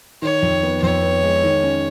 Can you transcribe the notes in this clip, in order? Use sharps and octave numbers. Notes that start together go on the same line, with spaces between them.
D#3 C#5
F2
B3
F2 C#5
B3
G#3
D#3
C#4